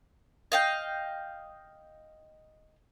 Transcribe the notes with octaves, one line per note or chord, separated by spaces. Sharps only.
D#5 F5 G5